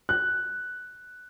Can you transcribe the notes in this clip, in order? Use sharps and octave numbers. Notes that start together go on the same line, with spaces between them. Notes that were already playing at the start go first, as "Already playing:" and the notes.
F#6